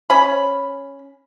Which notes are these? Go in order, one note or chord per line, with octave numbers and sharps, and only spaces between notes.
C#4 B5